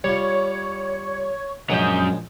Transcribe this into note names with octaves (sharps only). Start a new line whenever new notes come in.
G3 F4 C#5
A#1 F#3 G#3 C#4 C#5 D#6 G6